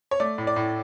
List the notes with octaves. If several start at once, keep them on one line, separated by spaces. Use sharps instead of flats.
C#5
A3 D5
A2
D5
A2